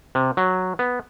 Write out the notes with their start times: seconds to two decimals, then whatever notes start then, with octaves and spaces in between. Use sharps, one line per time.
0.15 C3
0.37 F#3
0.79 B3